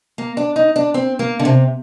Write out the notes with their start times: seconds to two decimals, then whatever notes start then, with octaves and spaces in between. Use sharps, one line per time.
0.18 A#3
0.37 D4
0.56 D#4
0.76 D4
0.94 C4
1.19 A#3
1.39 D3
1.45 C3